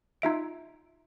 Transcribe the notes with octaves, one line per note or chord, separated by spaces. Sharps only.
D#4 F4 E5 D7